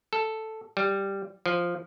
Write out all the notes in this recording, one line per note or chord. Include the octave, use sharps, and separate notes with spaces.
A4
G3
F3